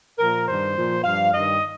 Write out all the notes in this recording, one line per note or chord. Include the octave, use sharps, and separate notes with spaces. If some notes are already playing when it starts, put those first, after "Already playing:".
A#2 F3 A#4
G2 D#3 C5
A#2 F3
G2 F3 F5
G2 D#3 D#5